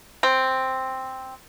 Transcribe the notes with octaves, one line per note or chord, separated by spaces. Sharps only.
C4